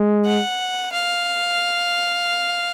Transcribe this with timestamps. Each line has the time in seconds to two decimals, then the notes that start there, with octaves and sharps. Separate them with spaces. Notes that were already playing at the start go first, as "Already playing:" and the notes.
Already playing: G#3
0.26 F#5
0.93 F5